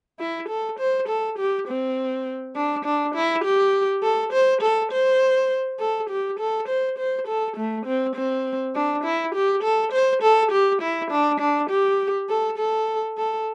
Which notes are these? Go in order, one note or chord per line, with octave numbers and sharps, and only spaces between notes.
E4
A4
C5
A4
G4
C4
D4
D4
E4
G4
A4
C5
A4
C5
A4
G4
A4
C5
C5
A4
A3
C4
C4
D4
E4
G4
A4
C5
A4
G4
E4
D4
D4
G4
A4
A4
A4